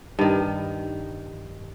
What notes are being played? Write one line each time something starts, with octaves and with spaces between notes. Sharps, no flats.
G2 D#3